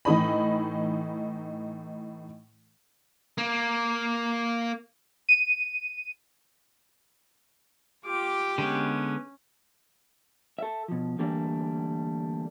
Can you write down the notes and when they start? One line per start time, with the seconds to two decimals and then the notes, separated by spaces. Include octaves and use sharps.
0.05 A2 E3 D#4 D#5 B5
3.38 A#3
5.29 D#7
8.05 F4 G4 D6
8.58 D3 G#3 B3 C#4
10.59 A4 E5
10.88 B2 F3
11.19 D3 E3 G3 A3 A#3 D4